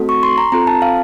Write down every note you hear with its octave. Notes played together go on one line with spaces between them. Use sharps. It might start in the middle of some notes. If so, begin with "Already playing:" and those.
Already playing: A3 C4 F#4 A4
C#6
C6
A#5
C4 F4 A4 A#5
A5
F5